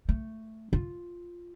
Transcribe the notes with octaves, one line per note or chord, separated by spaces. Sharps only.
A3
F4